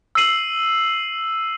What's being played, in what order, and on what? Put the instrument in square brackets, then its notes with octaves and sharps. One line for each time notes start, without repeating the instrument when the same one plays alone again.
[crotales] E6 C7 D#7 F#7